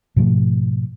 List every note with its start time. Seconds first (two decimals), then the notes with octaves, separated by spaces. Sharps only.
0.16 G#2 B2 F3 A3